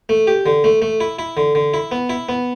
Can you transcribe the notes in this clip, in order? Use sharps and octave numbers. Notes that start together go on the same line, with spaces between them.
A3
G4
D3
A3
A3
E4
E4
D3
D3
E4
B3
E4
B3